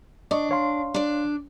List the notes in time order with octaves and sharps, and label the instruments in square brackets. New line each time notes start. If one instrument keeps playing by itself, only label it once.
[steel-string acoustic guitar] D4 [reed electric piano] D5 D#5 C#6
[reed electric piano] C#5 F5 C6
[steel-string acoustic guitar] D4 D5